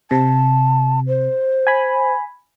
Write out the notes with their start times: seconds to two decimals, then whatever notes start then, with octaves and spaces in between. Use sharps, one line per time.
0.11 C3 A5
1.07 C5
1.67 G#5 B5